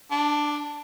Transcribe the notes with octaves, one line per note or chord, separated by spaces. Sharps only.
D4